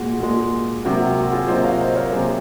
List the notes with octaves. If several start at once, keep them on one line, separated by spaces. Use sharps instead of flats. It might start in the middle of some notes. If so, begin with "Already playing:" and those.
Already playing: A#2 G#3 F#4
A#2 G#3
C3 F#3 A#3 F#4
F#4
F#4
F4 G#4
C3 F#3 A#3 C5 D#5
C#5 F5
C5 D#5
A#4 C#5
C3 F#3 A#3 G#4 C5